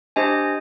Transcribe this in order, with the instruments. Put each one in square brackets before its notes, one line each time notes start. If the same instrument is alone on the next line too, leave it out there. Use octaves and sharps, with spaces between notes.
[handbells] D4 G4 C5 D#5 G#5